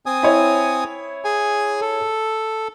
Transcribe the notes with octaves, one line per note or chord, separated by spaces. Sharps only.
C4 G#5 D#6
E4 C#5
G#4 G#5
A4